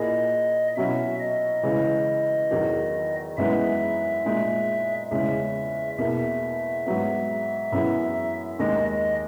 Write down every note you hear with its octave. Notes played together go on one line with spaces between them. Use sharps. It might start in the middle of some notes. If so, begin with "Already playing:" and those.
Already playing: A#2 A#3 E4 G#4 D#5
B2 F#3 C#4 E4 E5
D#5
C#3 E3 G#3
E2 D#3 F#3
F#2 E3 G#3 B3 D#4 E5
A#2 G#3 D#4
E2 C#3 G#3 C#4 E5
E2 B2 A#3 E5
G#2 F#3 B3
F#2 E3 B3 E4 G#4
D#2 D#3 G#3 D#5
D#5